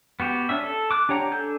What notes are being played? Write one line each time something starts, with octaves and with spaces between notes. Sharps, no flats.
B3 F#4 G4
C#4 D4 E5
A4
D6 F#6
D4 G4 C#5 F#5 A#5
D4 A4 G#5 G6